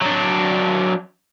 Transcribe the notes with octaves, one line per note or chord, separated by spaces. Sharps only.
F#3 D4